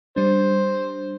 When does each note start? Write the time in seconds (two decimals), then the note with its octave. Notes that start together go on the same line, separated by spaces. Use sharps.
0.16 G3 D4 C5